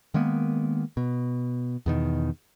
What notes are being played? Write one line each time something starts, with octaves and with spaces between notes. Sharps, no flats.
D#3 G#3 A#3 B3
B2
E2 B2 D#3